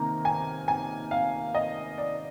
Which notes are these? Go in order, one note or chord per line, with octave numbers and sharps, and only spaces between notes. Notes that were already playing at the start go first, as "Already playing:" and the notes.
Already playing: C3 D#3 A#3 A#5
G#5
G#5
F5
D#5
D5